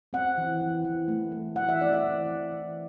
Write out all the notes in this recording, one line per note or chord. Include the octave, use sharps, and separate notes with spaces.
C4 F#5
E3
E3
E3
A3
A3
E3 F#5
E5
C4 D5
E5
E3
E3
E3